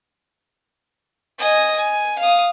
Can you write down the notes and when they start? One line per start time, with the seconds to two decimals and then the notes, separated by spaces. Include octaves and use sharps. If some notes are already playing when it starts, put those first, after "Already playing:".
1.39 D#5 G#5
1.76 G#5
2.19 F5 D#6